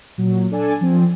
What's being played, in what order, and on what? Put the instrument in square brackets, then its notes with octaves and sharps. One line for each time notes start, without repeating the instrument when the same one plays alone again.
[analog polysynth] A#2 F#3
D4 A4 D5 G#5 A5
F3 C4